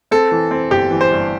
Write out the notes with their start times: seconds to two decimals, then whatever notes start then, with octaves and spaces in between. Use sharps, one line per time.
0.11 C4 A4
0.32 E3
0.51 C4
0.71 G1 G4
0.91 E3
1.01 C5
1.12 G2